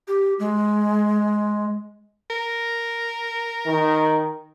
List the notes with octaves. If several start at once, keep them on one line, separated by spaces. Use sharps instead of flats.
G4
G#3
A#4
D#3